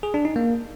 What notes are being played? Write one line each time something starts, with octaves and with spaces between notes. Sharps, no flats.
G#4
D4
D#4
A#3